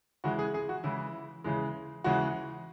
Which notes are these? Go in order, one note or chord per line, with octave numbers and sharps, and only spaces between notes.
C#3 E3 G#3 F#4
G#4
G#4
F#4
C#3 E3 G#3 E4
C#3 E3 G#3
C#3 E3 G#3 F#4